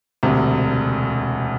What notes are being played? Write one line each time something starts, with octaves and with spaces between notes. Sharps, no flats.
E1 D2 C3